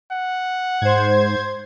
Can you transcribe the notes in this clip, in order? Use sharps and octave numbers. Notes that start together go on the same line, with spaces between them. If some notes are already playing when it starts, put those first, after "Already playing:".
F#5
G#2 C5 G#6